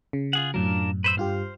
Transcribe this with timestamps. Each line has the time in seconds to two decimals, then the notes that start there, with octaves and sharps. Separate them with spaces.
0.13 C#3
0.33 F4 G#4 F#5
0.54 F#2 A2 F#3 D4 F4 A#4
1.04 B4 C5 E6
1.17 G2 F4 G4 C5 F6